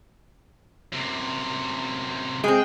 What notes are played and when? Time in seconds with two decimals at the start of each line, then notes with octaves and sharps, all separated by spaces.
0.92 F#2 C3
2.44 G#3 C4 G5